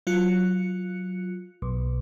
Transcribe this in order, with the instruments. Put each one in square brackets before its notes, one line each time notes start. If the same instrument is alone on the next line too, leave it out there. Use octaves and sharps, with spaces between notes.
[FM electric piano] F#3 F4 F#6 C#7
B1